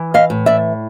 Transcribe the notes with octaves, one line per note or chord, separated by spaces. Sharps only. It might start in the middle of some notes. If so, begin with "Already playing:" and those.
Already playing: E3
D#5 F5
A2
D5 E5